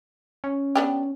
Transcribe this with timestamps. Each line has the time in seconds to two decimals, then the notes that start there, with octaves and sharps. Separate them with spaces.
0.44 C#4
0.75 B3 D4 G4